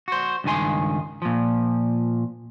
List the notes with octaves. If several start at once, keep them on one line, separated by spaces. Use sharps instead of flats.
F#4 C5
C#2 G2 D#3 G#5 C6
A#2 F3